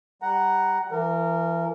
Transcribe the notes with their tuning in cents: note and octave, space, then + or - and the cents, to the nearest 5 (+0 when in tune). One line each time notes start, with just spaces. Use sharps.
G3 +0 F#5 +10 A#5 +0
E3 +35 A#4 -20